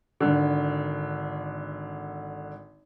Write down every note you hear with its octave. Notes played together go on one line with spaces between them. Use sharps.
G#1 D3